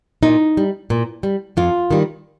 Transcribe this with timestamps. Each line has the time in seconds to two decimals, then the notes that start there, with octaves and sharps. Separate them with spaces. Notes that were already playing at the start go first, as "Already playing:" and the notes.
0.23 A#2 D#4
0.57 G3
0.90 A#2
1.23 G3
1.57 F2 F4
1.91 D#3 G3